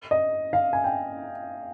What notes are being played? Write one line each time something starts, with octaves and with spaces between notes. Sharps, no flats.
D#5
F5
G#5
G5